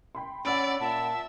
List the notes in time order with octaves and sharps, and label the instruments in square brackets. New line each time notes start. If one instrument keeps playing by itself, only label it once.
[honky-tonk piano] G5 B5 C6
[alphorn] C#4 [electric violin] D5 [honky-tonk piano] F#5 E6 D7 [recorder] B5
[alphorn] A#2 [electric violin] E5 [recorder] A5